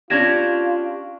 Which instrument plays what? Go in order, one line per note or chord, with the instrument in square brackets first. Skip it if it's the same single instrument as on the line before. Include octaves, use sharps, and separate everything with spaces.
[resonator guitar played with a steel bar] C#4 D4 G4 [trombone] F4 [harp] G#6 A#6 E7